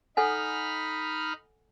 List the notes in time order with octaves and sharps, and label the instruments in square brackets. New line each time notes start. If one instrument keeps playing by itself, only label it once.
[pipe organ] D#4 B5 F6 [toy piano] A4 F#5 G#5